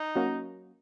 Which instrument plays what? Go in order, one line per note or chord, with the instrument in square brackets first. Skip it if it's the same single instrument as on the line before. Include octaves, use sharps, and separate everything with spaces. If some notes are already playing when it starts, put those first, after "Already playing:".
Already playing: [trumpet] D#4
[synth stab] F#3 A#3 C#4 F#4